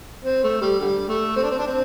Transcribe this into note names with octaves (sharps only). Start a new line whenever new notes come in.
C4
A3
G3
D3 G3
A3
C4
D4
C4
D4
C4